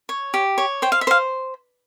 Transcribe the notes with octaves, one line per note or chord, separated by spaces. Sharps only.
C#5
G4
C#5
C5 G5
F5
E5
C5 F5